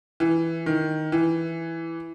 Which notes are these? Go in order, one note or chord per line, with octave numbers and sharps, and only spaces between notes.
E3
D#3
E3